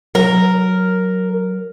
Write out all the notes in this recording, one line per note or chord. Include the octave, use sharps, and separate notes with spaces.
F#3 A#4